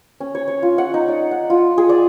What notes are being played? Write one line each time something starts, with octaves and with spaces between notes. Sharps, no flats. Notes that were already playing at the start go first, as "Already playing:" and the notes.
C#4
C#5
C#5
F4
F#5
D#4
D5
F#5
F4
G#4
D5